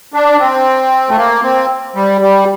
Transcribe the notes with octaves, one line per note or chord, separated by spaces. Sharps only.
D4
C4
A3
A#3
C4
G3
G3